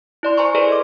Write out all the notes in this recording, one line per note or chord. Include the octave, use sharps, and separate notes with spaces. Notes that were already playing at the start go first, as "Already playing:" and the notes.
E4 D5 C6
C5 G#5 A#5 C6 C#6
G#4 A4 B4 C5 D5 G#5
D#5 D6